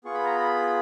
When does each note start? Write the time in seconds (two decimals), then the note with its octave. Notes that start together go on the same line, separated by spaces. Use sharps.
0.05 B3 F4 G#4 C#6
0.15 B5
0.25 A#5
0.36 B5